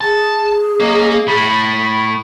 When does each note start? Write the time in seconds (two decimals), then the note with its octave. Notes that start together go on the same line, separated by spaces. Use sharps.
0.01 G#4 A5
0.80 F#3 A#3 C#4 D#5
1.28 A2 B5